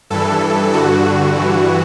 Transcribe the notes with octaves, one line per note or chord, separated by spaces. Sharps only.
G2 E3 A4
G2 D3 F#4
F#4
G2 E3